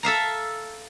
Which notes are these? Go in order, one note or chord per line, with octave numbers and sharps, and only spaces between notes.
A4 E5 F5 A#5